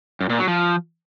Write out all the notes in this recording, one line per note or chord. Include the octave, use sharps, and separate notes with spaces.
F#2
A#2
F#3
F3